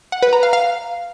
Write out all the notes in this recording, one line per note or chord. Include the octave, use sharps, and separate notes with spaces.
F#5
B4
A#5
F5
F5